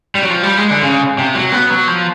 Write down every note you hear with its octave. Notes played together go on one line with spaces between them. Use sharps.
G3
F#3
F3
G3
G#3
D3
C#3
C3
F#3
B3
F#3
F3